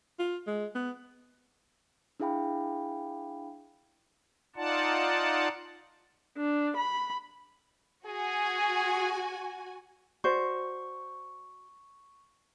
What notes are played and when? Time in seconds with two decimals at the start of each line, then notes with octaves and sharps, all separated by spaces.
0.20 F4
0.47 G#3
0.75 B3
2.20 D4 E4 G#4 F5 G5 B5
4.56 D#4 F4 D5 F#5 A5
6.37 D4
6.77 B5
8.06 F#4 G#4 G#5
10.24 F#4 C5 D5 C#6